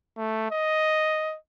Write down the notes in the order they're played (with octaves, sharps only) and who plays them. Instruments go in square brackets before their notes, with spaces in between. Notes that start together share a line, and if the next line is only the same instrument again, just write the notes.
[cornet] A3
D#5